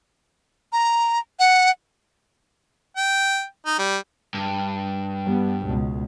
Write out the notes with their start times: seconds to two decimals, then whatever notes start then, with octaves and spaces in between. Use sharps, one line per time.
0.73 A#5
1.39 F#5
2.97 G5
3.66 D#4
3.79 G3
4.34 G2
5.25 G3 B3
5.66 C#2 B2